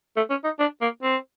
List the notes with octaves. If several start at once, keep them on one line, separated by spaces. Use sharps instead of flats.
A3
C#4
D#4
D4
A#3
C4